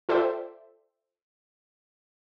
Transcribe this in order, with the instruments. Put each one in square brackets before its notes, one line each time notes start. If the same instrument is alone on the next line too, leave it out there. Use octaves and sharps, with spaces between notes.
[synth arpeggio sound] F4 A4 C5 D5 E5 G5